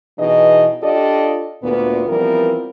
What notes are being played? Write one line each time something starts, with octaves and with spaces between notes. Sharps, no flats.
B2 E3 D#4 G#4 D#5
D4 F4 G4 A4 D5 D#5
D2 A#2 B3
E3 F3 G3 B3 C4 A#4